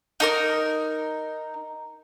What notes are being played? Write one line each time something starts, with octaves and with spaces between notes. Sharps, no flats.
D#4 A#4 F6